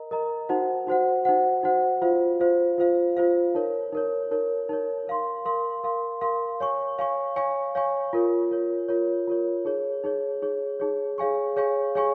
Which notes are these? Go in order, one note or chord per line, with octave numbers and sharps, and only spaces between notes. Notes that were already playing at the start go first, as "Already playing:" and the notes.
Already playing: A#4 D#5 A#5
A#4 D#5 A#5
D#4 F#4 C5 F#5
D#4 F#4 C5 F#5
D#4 F#4 C5 F#5
D#4 F#4 C5 F#5
F4 C5 F5
F4 C5 F5
F4 C5 F5
F4 C5 F5
D#4 A#4 C#5
D#4 A#4 C#5
D#4 A#4 C#5
D#4 A#4 C#5
A#4 F5 C6
A#4 F5 C6
A#4 F5 C6
A#4 F5 C6
C#5 F5 G#5 C#6
C#5 F5 G#5 C#6
C#5 F5 G#5 C#6
C#5 F5 G#5 C#6
F4 A#4 C#5
F4 A#4 C#5
F4 A#4 C#5
F4 A#4 C#5
D#4 G#4 C#5
D#4 G#4 C#5
D#4 G#4 C#5
D#4 G#4 C#5
G#4 C#5 F5 G#5 C#6
G#4 C#5 F5 G#5 C#6
G#4 C#5 F5 G#5 C#6